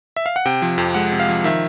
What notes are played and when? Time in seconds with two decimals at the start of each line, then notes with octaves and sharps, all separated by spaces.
0.16 E5
0.26 F5
0.36 F#5
0.46 C3 G5
0.62 F3
0.78 F2
0.94 G#3 F#5
1.12 C3
1.20 F5
1.29 F3
1.44 D#3 E5